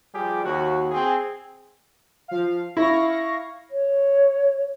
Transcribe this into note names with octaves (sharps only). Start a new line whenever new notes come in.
F3 G3 G4 G#4
D#2 F#4
C4 G#4
F3 F5
E4 F5 C#6 A#6
C#5